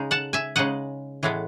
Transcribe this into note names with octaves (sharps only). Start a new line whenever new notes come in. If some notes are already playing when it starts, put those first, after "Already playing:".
Already playing: C#3 G#3 D#4
F#5 A5
E5 G#5
C#3 G#3 D#4 D#5 F#5
A2 E3 G#3 B3